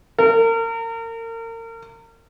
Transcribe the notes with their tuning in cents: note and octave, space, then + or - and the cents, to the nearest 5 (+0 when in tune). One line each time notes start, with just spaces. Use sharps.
A#4 -35